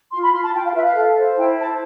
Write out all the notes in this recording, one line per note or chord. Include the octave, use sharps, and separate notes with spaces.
F4 C6
B5
F4 C6
A5
F4 G5
F5
B4 E5
F5
A4
C5
E4 G5
C5 A5